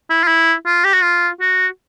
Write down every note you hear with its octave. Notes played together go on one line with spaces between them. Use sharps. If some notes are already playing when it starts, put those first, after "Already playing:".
E4
F4
E4
F4
G4
F#4
F4
F#4